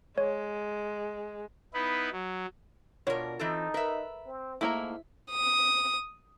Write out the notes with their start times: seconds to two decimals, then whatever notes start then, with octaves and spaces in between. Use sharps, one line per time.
0.18 G#3 C#5
1.74 B3 D#4 E4 B4
2.12 F#3
3.07 B2 D4 F4 A#4 C#5
3.39 E3 C4 D#4 A4
3.74 A#4 B4 E5
4.25 C4
4.61 G#2 A3 A#3 E4 A#5
5.31 D#6